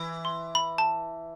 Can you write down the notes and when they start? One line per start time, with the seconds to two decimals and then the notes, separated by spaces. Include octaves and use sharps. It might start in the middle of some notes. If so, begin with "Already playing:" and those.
Already playing: E3
0.25 C6
0.55 B5
0.78 A5